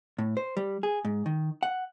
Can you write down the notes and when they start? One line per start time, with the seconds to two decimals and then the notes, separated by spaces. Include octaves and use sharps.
0.19 A2
0.37 C5
0.57 G3
0.83 G#4
1.05 G#2
1.26 D#3
1.63 F#5